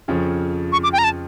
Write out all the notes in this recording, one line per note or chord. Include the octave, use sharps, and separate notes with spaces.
F2 C#3 F3 C#4
C#6
D6
G5
A#5
A5